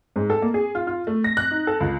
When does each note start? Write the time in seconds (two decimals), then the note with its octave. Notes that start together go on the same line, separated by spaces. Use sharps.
0.16 G#2
0.30 A4
0.42 A#3
0.54 G#4
0.75 F4
0.87 F4
1.07 A3
1.24 A#6
1.37 F#6
1.51 D#4
1.67 A4
1.81 C#2